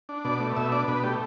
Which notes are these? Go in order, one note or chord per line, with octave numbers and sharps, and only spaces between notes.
D4
B2 D5
A3
B2 E5
D4 D5
B2 B4
A3 G4